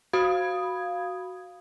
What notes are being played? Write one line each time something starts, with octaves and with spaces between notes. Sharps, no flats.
F#4 F5 B5 D#6 G#6